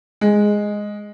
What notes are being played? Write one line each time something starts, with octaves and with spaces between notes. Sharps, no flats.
G#3